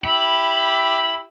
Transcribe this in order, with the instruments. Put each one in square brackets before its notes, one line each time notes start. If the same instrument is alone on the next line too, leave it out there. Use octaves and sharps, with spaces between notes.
[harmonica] E4 G4 [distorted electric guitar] B5